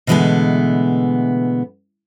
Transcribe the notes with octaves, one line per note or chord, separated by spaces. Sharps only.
B2 D3 E3 G#3 A3 B3